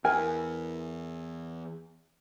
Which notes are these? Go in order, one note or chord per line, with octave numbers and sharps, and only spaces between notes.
E2 E4 A#4 G#5